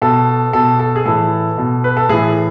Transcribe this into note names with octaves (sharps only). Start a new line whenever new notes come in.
B2 A4
B2 A4
A4
G#4
A2 E3 A4
B2
B4
A4
A2 E3 G#4